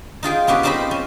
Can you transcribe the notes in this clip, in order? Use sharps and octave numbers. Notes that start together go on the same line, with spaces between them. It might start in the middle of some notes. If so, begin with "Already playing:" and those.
D#4 F4 G#4 G5
B3 C#4 G4 G#4 B4
C4 C#4 D#4 C5 D#5 B5
C#4